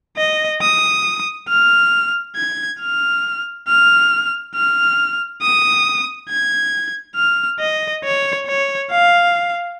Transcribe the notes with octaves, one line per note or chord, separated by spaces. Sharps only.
D#5
D#6
F6
G#6
F6
F6
F6
D#6
G#6
F6
D#5
C#5
C#5
F5